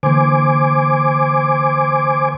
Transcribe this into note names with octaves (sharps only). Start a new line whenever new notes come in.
D3 E3 A#3 C5 G#5 D6